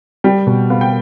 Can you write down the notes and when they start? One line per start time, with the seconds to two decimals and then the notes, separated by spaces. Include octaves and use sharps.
0.24 G3 G5
0.47 B2
0.70 B3 F5
0.81 G5